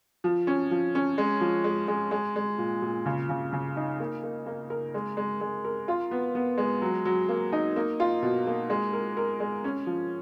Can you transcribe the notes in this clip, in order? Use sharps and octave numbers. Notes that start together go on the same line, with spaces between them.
F3
C#4
F3
C#4
G#3
F3
G#3
G#3
G#3
G#3
A#2
A#2
C#3
C#3
C#3
D#4
A#3
A#3
A#3
A#4
G#3
G#3
G#3
A#4
F4
B3
B3
G#3
F#3
F#3
A#3
D#4
A#3
F4
B2
A#3
G#3
A#4
A#4
G#3
C#4
F3